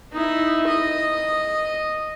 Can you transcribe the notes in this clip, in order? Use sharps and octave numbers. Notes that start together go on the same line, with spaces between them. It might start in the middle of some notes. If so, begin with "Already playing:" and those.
D#4 E4
D#5